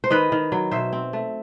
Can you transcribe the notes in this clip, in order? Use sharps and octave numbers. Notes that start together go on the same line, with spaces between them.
C5
D#3 B4 D#5
D#3
F#3
B2 C5 E5
C4
A3